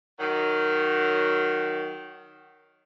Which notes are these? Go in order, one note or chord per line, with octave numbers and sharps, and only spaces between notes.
D#3 F#3